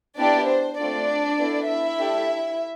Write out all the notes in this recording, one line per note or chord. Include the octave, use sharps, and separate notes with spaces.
B3 D4 E4 G4 D5
C5
A3 C4 D4 F4 A4 D5
B3 E4 A4
E4 E5
A3 D4 G4